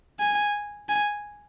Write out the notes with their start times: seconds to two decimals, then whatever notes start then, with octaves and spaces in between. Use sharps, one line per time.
0.20 G#5
0.89 G#5